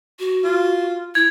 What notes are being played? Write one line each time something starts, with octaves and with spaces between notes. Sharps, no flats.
F#4
F4
E4 G#6